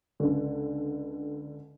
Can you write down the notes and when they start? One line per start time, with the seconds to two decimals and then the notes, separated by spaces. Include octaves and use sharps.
0.20 C#2 D3